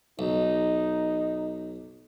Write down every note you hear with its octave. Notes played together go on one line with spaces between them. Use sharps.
B1 D#4